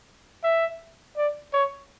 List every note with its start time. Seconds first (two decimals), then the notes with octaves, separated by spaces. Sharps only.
0.44 E5
1.17 D5
1.53 C#5